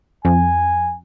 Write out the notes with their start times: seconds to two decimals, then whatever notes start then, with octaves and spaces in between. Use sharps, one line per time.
0.25 F2 G#5